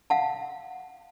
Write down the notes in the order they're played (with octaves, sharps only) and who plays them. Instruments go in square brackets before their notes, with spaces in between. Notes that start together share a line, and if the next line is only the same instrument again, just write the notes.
[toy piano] F5 F#5 A5